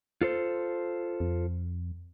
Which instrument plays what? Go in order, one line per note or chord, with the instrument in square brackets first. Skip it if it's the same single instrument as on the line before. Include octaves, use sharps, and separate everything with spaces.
[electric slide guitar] F4 A4 C5
[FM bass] F2